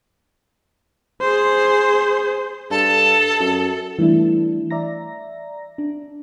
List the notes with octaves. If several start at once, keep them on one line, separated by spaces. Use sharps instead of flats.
G#4 C5
G2 A4 A5
F#2
E3 G3 A3 D4 E4
D5 E5 A#5 A#6
D4